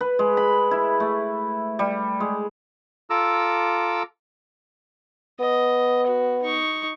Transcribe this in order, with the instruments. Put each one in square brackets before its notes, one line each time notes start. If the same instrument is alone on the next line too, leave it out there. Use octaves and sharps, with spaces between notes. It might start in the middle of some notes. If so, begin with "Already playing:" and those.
[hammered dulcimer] B4
G#3
B5
E4
A3
G3
G#3
[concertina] F4 A4 A#5 D6 E6
[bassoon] B3 [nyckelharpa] D#5
[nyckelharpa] F#4
D#4 C#6